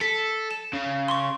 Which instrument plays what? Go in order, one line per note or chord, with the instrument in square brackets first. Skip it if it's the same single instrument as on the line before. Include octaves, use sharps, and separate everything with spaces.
[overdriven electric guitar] A4 [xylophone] B6
[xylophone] E7
[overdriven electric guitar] C#3
[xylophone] C6 C#6